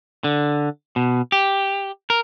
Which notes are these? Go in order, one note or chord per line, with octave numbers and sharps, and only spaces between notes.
D3
B2
G4
A#4